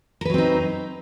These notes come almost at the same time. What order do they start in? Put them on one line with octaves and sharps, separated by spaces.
A#4 B4 F#3 C4 D#4